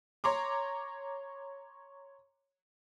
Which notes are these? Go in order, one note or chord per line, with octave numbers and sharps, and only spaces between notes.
C#5 A#5 C6 D6